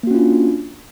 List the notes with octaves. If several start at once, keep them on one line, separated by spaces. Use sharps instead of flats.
A#3 C#4 D4 F4 F#4